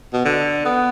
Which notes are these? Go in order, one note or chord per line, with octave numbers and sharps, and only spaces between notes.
B2
D3
B3